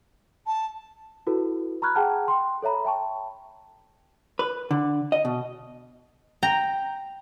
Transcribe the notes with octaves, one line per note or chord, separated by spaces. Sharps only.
A5
E4 F#4 A4 B4
A#5 B5 C#6 F6 F#6 G#6
G#4 F#5 G5 A5 A#5 F6
G5 C6
A4 C#5 E5 A#5 B5
E5 G5 A5 C#6
B4
D3
D#5
B2
G5 A#5